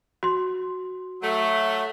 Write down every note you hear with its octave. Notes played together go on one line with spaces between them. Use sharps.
F#4 C6
F#3 A3